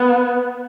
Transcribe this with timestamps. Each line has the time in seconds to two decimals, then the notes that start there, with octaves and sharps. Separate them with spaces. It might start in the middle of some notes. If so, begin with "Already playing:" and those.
Already playing: B3